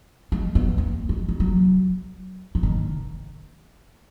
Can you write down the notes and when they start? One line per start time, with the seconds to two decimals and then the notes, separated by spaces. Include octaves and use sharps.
0.32 G#3
0.55 B3
0.78 A#3
1.09 G#3
1.29 G#3
1.40 F#3
2.55 E3
2.63 D#3